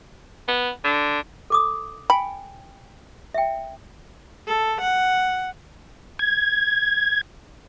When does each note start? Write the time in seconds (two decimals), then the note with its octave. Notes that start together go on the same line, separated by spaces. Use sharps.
0.48 B3
0.84 D3
1.50 A4 D6 D#6
2.10 G5 G#5 B5
3.34 E5 G5
4.48 A4
4.81 F#5
6.19 G#6